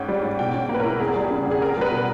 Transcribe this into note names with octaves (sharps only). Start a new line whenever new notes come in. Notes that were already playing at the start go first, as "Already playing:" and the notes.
Already playing: G#2 C#4 G5
G3
G#2
B2 G5
C#4
A#3
B4
E4 A#4
E2 G#4
G3
C#3
E2
G#4
E2 A#4
G3 B4
B2